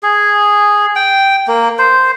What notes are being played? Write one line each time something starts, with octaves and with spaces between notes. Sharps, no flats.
G#4
G5
A#3
C5